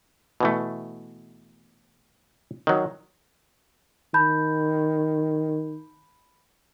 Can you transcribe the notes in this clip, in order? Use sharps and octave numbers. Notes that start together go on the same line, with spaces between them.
B2 E3 A3
D#3 F#3
D#3 A5 B5 G6